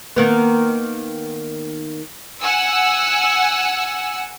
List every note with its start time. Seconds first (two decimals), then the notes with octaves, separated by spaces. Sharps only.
0.16 D#3 A#3 B3
2.41 F#5 G#5 E6